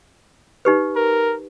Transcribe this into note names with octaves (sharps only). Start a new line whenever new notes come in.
D#4 G4 B4
A#4